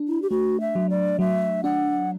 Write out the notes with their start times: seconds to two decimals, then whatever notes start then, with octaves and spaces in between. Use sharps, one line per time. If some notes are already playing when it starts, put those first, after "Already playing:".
Already playing: D4
0.08 E4
0.22 G4
0.30 A3 F#4
0.60 E5
0.75 F#3
0.90 D5
1.19 F#3 E5
1.64 D4 F#5